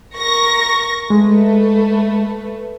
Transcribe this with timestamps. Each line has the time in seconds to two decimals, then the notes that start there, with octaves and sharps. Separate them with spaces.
0.16 A#4 C#6 A#6
1.10 G#3 A3 B4